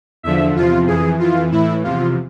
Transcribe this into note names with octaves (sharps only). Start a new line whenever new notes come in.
E2 D3 F3 E5
E2 C3 F3 F4
F2 E3 G#4
F2 E3 F4
A2 E3 E4
E2 C3 F3 F4